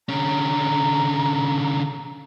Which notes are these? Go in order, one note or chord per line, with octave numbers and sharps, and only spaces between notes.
D3 C#4 A#5